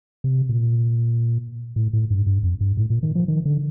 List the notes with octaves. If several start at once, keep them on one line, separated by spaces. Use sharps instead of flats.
C3
A#2
A2
A2
G2
G2
F2
G2
A2
A#2
D#3
F3
D#3
D3